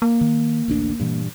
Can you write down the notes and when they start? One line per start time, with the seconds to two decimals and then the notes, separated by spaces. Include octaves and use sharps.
0.02 A#3
0.21 D#3
0.68 A1 D2 D4
1.00 G2 A#2 E3